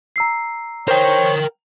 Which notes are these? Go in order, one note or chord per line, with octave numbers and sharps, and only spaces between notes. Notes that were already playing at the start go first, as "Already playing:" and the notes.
A#5 E6 C7
A#4 C5 C#5 G5